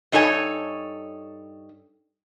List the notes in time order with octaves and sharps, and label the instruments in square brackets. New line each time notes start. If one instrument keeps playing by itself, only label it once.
[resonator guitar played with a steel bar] G2 D#4 A4 C#5 G#5